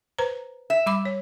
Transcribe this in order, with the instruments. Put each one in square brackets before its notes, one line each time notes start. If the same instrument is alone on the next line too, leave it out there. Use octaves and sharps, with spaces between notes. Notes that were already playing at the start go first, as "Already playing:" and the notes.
[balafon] B4 C5 A#5
[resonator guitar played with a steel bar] E5
[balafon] G3 B5 D6
C#5